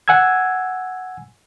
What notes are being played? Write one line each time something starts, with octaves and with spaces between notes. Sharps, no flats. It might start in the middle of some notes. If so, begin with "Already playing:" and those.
F#5 G#5 E6 G#6